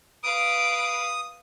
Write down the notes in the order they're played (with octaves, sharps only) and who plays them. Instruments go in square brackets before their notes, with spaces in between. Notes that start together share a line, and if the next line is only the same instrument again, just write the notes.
[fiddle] B4 F5 [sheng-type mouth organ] D#6 [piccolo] D7